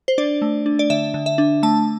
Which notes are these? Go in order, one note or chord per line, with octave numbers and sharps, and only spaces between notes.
C5
D4 D5
A3
D4
D5
D3 E5
D3
E5
D4
A3 A5